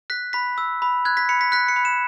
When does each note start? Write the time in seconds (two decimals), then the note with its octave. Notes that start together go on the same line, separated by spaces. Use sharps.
0.10 F#6 B6
0.33 B5 B6
0.58 E6
0.82 B5
1.05 F#6 G#6
1.17 B6
1.29 B5 C#7
1.41 B6
1.52 F#6 B6
1.68 C#7
1.76 B5
1.85 E7